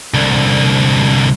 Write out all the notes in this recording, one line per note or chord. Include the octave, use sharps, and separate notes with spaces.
C2 D3